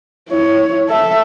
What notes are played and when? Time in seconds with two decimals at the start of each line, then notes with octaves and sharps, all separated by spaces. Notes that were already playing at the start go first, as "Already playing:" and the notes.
0.29 E4 C#5
0.89 A4 E5